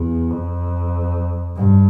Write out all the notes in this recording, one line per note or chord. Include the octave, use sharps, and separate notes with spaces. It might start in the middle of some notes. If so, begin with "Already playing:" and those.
Already playing: E2
F2
G2